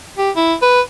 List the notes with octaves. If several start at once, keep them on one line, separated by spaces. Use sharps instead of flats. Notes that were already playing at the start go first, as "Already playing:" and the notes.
G4
E4
B4